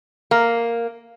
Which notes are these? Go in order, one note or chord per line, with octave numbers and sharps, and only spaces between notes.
A#3